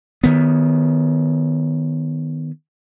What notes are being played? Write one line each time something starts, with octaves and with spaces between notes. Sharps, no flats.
D#3 B3